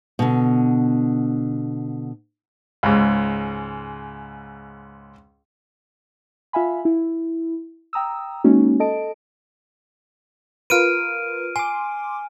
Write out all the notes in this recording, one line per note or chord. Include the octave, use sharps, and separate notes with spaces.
B2 D3
C#2 G#2
F4 E5 F5 G#5 B5
E4
G5 A#5 D#6 E6
G#3 A#3 C#4 D#4 F#4
A4 D#5 A5 D7
F4 A#4 B4 F6 D7 D#7
G#5 C6 D6